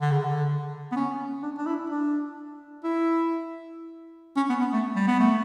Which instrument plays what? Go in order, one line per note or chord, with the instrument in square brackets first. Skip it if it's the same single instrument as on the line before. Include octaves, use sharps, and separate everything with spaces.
[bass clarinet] D3
C#3
D3
B3
C#4
D4
D4
E4
D4
E4
C#4
B3
B3
A3
G3
B3
A3